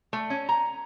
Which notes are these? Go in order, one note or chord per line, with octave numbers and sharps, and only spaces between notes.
A3
C#4
A#5